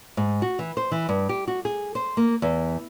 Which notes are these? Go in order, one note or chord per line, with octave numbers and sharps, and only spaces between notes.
G#2
F#4
E3
C5
E3
G2
G4
F#4
G#4
C5
A#3
E2